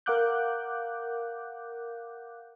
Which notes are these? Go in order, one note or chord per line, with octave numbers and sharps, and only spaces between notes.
A#4 F5 F#5 D6 F#6 G6